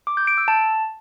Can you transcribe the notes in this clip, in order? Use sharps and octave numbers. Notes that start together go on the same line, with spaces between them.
D6
G6
D7
E6
A5